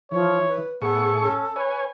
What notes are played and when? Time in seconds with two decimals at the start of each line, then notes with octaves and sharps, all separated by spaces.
0.11 E3 F3 C#5
0.48 B4
0.82 A2 B3 G#4 A4 C#6
1.22 C#4
1.56 B4 C#5 G#5